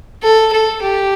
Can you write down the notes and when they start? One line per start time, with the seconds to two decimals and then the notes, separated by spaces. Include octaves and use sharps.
0.24 A4
0.53 A4
0.82 G4